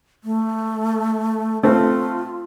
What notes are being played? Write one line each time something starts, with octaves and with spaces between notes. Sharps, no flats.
A3
A3 C4 F4